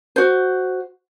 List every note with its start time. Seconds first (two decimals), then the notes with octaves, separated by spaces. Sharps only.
0.16 F#4 C5